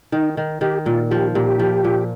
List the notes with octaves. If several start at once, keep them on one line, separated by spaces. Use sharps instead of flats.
D#3 D#4
D#3
D#3 G4
A#2 F4
F3 G4
A#2 G4
F3
A#2